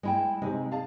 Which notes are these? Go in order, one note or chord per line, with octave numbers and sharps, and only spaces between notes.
G#3 E4 G5
C3 G#3 C4 D#4
G#4 F5 A5